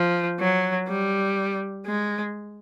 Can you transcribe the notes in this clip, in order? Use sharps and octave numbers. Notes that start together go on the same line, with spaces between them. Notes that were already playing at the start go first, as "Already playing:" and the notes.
Already playing: F3
F#3
G3
G#3